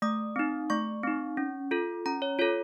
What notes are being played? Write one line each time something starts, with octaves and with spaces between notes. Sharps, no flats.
A3 D#6
C4 D#4
A3 C#6
C4 D#4
C#4
F4 A4
C#4 A#5
C#5
F4 A4 C#5